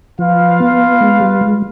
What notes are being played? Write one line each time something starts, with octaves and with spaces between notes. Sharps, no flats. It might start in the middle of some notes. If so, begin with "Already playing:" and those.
F3 F4 B4 F5
B3
G#3
G3
G#3